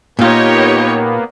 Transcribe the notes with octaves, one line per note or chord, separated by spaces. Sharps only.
A#2 A#3 B3 D#4 F4 G4 C#5